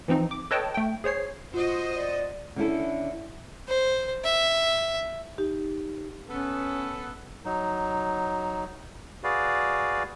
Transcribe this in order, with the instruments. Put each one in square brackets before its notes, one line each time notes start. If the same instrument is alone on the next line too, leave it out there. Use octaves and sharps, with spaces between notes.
[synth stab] E3 F3 C4 D#4
D6
A4 B4 C#5 D#5 G5 A5
A3 G5
G#4 C5 C#5 C7
[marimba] F4 [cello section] F#4 C5 D#5
[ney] D5
[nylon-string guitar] D3 C#4 E4 A4
[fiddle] C5
E5
[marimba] D#4 G4
[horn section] B3 A4 [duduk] C#4
[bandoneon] F#3 D#4
F#4 G#4 B4 D5 F5